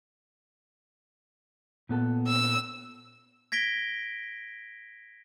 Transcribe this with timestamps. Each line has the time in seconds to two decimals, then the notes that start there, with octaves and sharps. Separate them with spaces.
1.89 A#2 B3 A4
2.27 E6
3.52 G#6 A#6 B6 D7 G7